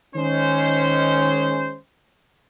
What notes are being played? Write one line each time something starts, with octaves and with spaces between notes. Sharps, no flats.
D#3 G#3 C#4 C5